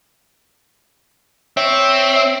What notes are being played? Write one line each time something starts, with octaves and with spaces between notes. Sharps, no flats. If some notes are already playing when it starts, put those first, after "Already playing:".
C4 C#5 E5 G5